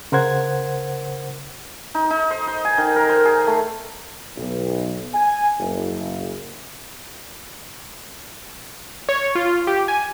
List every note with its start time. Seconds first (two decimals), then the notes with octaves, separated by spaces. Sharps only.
0.12 C#3 A#4 C5 F#5 G#6
1.95 D#4
2.11 D#4
2.31 C5
2.47 C5
2.65 G#5
2.78 D#3
2.96 A#4
3.09 C5
3.25 G#4
3.47 A3
4.36 B1
5.13 G#5
5.59 F#1
9.09 C#5
9.35 F4
9.67 G4
9.88 G#5